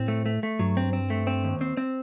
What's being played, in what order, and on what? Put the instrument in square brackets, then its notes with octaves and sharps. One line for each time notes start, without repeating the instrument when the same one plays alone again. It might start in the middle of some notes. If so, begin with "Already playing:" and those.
Already playing: [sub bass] A2 [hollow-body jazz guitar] C4
[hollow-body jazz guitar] A3
A3
A3
[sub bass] G2 [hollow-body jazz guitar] F#3
[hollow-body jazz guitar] C4
C4
A3
C4
D#2
C4
C4